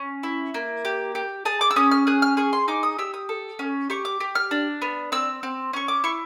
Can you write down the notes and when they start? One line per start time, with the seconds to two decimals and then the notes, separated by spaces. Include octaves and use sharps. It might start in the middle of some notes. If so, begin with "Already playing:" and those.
Already playing: C#4
0.23 E4
0.54 A#3
0.85 G4
1.15 G4
1.45 G#4 A5
1.61 D6
1.71 E6
1.76 C#4 D#6
1.91 F6
2.07 G#4 F#6
2.22 F6
2.37 G#4 C#6
2.53 C6
2.68 D#4 D6
2.83 D#6
2.98 G4 E6
3.14 D#6
3.29 A4
3.59 C#4
3.90 G4 C#6
4.05 D6
4.20 G4
4.35 F6
4.51 D4
4.82 B3
5.12 C4 E6
5.43 C4
5.73 C#4 C#6
5.88 D6
6.04 E4 C#6